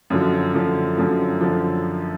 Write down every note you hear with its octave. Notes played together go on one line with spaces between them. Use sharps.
F#2 D3 F3
F#2 D3 F3
F#2 D3 F3
F#2 D3 F3